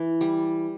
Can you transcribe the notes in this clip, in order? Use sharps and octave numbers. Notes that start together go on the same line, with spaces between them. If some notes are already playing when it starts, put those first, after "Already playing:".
Already playing: E3
G3